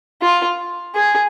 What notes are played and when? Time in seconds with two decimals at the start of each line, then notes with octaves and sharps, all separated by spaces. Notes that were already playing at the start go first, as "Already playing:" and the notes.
0.22 F4
0.95 G#4